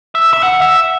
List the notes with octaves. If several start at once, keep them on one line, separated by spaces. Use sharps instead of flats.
E5
E5
F#5
E5